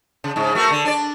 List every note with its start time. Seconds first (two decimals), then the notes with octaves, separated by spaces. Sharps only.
0.24 C#3
0.36 G#2 C#3
0.55 A3 F#4 A#4
0.71 D3
0.85 D4 D5